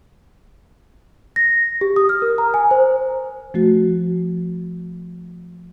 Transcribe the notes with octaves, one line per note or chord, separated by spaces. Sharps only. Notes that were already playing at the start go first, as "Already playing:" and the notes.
A#6
G4
D#6
F6
A#4
A#5
G#5
C5
F3 A3 F#4